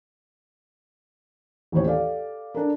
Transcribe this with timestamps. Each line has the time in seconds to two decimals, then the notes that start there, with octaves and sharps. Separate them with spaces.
1.72 A1 D#2 C5 C#5
1.85 G4 A4 D5 F5
2.55 D4 A4 A#4